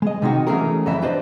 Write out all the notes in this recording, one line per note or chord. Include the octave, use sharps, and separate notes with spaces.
G#3 D#5
C3 D#3 G#3 D#4 F#4
E3 F#3 A3 C#4 G#4 A#4
F2 C#3 E3 E5
D4 G4 B4 C5 D5 D#5